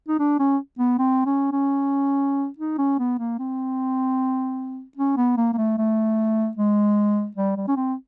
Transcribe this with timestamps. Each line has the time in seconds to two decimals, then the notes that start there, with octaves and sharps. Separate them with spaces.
0.08 D#4
0.20 D4
0.40 C#4
0.79 B3
0.99 C4
1.26 C#4
1.52 C#4
2.58 D#4
2.78 C#4
2.99 B3
3.19 A#3
3.39 C4
4.97 C#4
5.17 B3
5.37 A#3
5.53 A#3
5.58 A3
5.78 A3
6.57 G#3
7.36 G3
7.57 G3
7.68 C#4
7.77 C4